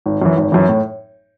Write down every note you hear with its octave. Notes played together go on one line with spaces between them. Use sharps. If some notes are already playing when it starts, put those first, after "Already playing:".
G#1
F#2 E3
G#1
F#2 E3
A2